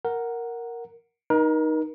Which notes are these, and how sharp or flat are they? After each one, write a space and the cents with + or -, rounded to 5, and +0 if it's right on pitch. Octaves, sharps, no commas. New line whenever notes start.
A#4 +0 F#5 +0
D#4 +0 A#4 +35